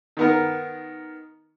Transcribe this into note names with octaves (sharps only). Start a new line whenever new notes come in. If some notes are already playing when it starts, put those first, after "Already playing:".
D#3 B3 A#4